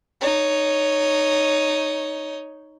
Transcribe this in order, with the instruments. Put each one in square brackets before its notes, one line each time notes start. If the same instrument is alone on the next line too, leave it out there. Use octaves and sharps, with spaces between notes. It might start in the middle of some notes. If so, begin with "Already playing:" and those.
[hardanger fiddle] D#4 C#5